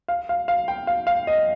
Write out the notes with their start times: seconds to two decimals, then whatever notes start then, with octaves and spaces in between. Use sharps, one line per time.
0.08 F5
0.29 F5
0.48 F5
0.68 G5
0.87 F5
1.07 F5
1.27 D#5